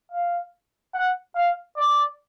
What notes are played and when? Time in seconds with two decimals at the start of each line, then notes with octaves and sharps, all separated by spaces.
0.12 F5
0.94 F#5
1.35 F5
1.77 D5